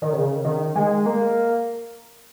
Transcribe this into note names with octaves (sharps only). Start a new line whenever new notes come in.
D#3
C#3
D#3
G#3
A#3